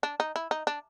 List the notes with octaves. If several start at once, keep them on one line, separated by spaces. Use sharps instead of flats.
D4
D#4
E4
D#4
D4